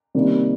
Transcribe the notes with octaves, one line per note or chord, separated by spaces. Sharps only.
C3 D#3 G3 A#3